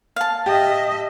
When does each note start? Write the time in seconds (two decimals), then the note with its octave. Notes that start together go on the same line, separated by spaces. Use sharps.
0.16 F5 A5
0.46 G4 D#5 E5